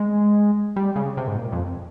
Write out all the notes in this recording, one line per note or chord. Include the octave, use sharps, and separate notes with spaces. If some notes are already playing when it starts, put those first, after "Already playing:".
Already playing: G#3
G3
C#3
C3
G#2
A#2
F2